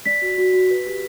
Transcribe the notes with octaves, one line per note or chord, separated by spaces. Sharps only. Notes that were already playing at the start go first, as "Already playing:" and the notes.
D5 B6
F#4
F#4
F#4
B4
G4